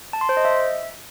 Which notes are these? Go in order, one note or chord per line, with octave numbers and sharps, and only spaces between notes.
A5
C6
C5
D#5
E5